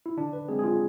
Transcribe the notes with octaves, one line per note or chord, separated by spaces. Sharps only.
E4
D3 D4
B4
G#3 C4 G#4
G#4
F4